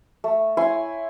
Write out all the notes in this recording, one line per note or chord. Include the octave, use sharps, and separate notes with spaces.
A3
E4 C#5 G#5 C6